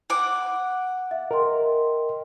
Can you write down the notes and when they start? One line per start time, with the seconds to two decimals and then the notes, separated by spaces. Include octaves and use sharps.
0.10 F#5 D6
1.11 E5 F5
1.31 A#4 D#5 G5 C6